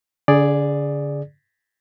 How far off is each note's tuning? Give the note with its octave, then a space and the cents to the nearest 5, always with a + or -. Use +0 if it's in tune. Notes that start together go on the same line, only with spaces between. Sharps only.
D3 -40 G#4 +0 D5 +0